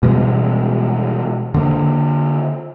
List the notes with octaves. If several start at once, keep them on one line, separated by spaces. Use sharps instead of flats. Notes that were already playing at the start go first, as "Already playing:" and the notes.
B2 E3 G3 G#3
D3 A#3